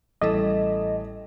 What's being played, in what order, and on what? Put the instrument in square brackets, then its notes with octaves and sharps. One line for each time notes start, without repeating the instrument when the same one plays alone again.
[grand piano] A1 A3 [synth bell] G3 E4 A4 [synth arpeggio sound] D#5